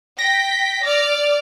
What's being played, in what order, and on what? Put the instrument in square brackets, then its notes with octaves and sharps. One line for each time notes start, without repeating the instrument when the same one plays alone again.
[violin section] G5 B6 [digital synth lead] A#6
[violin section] D5 D6 F6